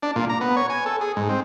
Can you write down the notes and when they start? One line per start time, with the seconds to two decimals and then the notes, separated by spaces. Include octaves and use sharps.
0.02 D4
0.16 A#2
0.29 A#5
0.41 B3
0.57 C#5
0.70 G#5
0.86 A4
1.01 G#4
1.16 G#2
1.29 C4